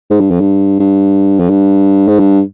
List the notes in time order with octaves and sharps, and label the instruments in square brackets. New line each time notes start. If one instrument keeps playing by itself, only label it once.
[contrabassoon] G#2
G2
F2
G2
G2
F2
G2
G#2
G2